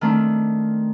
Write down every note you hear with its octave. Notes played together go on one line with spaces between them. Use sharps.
D#3 A3 C4 D4